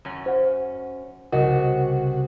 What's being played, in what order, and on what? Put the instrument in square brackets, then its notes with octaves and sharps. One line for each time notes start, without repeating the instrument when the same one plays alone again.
[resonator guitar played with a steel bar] F#2 C#4
[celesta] C5 F#5
[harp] C2 C#3 G3 [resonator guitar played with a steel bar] F#4 [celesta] A#4 D#5